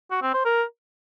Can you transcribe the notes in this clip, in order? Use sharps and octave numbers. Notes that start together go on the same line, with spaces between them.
F#4
C4
C5
A#4